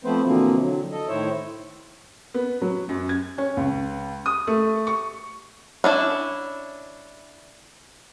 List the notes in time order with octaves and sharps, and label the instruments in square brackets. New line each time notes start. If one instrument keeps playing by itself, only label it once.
[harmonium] F3 A3 B3 C4 B4 C5
B2 D3 E3 F3 A#3 C4
D3 F#3
A4 D#5
A2 D#3 E4 C5 C#5 E5
[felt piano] B3
F#3
F#2
G#6
C#4
C#2
D#6
A3
C#6
[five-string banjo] C#4 D4 E4